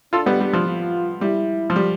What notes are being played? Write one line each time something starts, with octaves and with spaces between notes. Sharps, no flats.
D4 F4 A4
G3 B3
G3
F3
F4
G3 E4
F3
G3